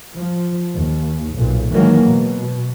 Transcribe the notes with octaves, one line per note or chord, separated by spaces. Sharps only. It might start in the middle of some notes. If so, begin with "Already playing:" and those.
F3
D#2
B1 A#2
D#3 E3 F#3 G#3 A#3
B2